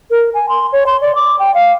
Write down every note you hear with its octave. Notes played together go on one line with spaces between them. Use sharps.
A#4
G#5
C6
C#5
C6
D5
D6
G5
F5